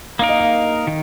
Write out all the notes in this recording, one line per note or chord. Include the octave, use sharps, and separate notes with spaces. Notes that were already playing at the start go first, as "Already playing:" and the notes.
A#3 D#4 A#4 F5
D#5
F5
D#3